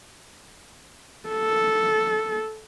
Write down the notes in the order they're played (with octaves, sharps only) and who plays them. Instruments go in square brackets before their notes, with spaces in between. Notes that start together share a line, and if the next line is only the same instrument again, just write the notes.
[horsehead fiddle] A4